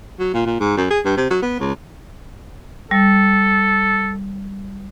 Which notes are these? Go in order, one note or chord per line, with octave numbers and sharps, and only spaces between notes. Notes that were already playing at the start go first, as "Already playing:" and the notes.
F#3
A#2
A#2
G#2
F#2
G#4
G2
C3
F#3
B3
C#2
G3 A4